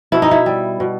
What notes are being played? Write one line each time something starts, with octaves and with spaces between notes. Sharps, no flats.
B2 E4
D#4
E4
G3
B2